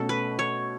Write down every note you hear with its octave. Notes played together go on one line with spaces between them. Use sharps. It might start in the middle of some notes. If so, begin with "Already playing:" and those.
Already playing: B2 A3 C#4 F#4 A4
B4
C#5